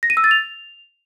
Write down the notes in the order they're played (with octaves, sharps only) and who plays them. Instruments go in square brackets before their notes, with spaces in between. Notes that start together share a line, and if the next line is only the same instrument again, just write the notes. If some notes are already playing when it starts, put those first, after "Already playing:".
[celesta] A#6
D#7
E6
A6
F7